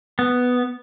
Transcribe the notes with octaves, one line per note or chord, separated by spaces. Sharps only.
B3